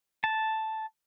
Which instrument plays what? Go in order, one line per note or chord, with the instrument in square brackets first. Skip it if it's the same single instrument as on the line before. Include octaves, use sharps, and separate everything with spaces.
[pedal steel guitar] A5